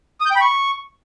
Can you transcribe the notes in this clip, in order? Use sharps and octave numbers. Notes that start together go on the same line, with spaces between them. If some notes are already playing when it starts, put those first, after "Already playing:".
D#6
G6
G5
B5
C#6